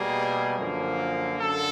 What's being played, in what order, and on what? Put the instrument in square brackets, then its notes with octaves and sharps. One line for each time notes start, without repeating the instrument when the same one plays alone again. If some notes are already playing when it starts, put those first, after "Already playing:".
Already playing: [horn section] B2 G3 A#3 G#4
F#2 D3 F3 A#3
F#2 D3 A4